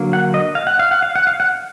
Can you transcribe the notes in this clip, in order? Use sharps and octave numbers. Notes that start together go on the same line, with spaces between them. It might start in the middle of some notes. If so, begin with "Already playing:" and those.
Already playing: D3 F#3 A#3
F#5
D#5
F5
F#5
F5
F#5
F5
F#5
F5
F#5